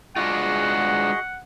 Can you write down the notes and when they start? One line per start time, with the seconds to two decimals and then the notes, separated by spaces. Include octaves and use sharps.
0.16 G#3 D4 F4 F#4 G#4 D#5 F#5